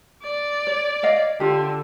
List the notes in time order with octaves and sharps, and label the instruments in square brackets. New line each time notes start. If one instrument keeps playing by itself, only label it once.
[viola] D5
[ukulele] C#5
C#5 D#5 F5
[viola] D3 [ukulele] F4 G4